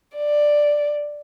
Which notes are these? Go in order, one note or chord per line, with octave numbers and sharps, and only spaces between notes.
D5